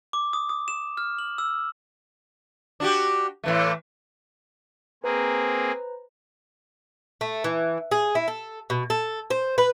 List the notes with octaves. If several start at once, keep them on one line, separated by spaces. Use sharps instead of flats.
D6
D#6
D#6
E7
F6
F#7
E6
D4 F#4 G4
A2 E3 A3
A#3 C4 G#4 B4 C5 A#5
A3
E3
G#4
E4
A4
B2
A4
C5
B4